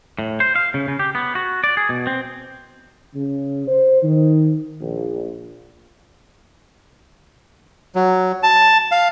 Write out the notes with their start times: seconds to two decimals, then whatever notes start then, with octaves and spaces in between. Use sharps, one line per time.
0.19 A2
0.40 C5
0.56 F5
0.74 C#3
0.88 C#3
0.99 G4
1.15 B3
1.35 F#4
1.64 D5
1.77 G#4
1.89 B2
2.07 C4
3.15 C#3
3.68 C5
4.03 D#3
4.81 A#1
7.95 F#3
8.43 A5
8.92 F5